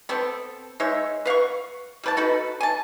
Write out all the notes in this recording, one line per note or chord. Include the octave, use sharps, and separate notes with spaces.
B3 C4 A4
G#3 D#4 C#5 E5
B4 F5 F#5 C#6
G3 B4 A5
D#4 F#4 A4 B4
G#5 A5